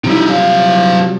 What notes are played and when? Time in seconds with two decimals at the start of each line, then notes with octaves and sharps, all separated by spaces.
0.04 C3 F3 G3 D#4 E4
0.29 F#3 F5